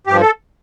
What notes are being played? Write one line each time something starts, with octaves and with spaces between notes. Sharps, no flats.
G2 F3 G4
A4